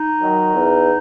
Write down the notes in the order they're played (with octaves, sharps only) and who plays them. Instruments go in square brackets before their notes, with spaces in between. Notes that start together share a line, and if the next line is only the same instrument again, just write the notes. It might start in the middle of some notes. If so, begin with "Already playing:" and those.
Already playing: [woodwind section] D#4
D#3 F#3
E2